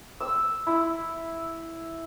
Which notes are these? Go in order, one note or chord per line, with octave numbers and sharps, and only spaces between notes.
E6
E4